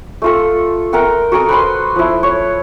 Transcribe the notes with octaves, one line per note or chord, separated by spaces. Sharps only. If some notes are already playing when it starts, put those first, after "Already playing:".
A3 F4 A4
A#4 E5 F#5 G5
F#4 A4 A#4 D#6
B4 C5 B5 C6
F3 E4
C#5